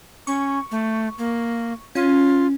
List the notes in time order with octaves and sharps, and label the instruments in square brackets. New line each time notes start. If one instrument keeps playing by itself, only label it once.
[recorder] C#4 [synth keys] C#6
[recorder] A3
A#3
[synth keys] C#4 [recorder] F4